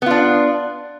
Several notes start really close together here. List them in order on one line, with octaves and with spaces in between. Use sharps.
B3 F4 D4